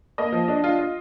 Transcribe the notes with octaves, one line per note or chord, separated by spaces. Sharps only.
A#3 D#5
F3
D4
F4
F4